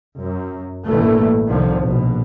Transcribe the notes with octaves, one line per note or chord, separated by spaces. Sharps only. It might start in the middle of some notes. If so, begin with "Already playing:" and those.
F#2
A1 G2 B2 E3 A3 A#3
C2 D3 D#3 F3
A#1 B2